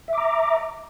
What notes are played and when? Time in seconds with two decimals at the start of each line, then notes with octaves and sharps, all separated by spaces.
0.08 E5
0.13 D6
0.18 A#5